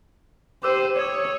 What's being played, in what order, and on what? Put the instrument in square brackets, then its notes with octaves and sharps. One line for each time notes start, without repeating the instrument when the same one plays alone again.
[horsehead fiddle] G4 C5 [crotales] D6 E6 D#7
[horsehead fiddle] C#5 [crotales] D#6 G#6 E7